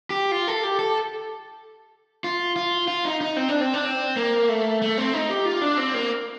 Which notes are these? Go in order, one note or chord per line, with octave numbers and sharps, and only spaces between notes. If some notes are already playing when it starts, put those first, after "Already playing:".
G4
F4
A4
G4
A4
F4
F4
F4
D#4
D#4
C4
D4
C4
D4
C4
A#3
A3
A3
C4
D#4
G4
F4
D4
C4
A#3